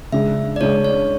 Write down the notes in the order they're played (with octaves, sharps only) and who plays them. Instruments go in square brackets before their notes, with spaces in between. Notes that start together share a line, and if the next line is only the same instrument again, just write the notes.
[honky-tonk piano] C#3 G#3 D4 [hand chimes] E5
[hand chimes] D5
[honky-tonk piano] C#3 G#3 D4 [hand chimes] C#5
[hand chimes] C#5